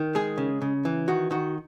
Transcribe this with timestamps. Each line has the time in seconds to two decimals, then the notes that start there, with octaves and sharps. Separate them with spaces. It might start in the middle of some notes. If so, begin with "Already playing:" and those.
Already playing: D#3
0.15 G#3 G#4
0.38 C#3
0.62 C#3
0.85 E3
1.08 D#3 F#4
1.31 D#3 F#4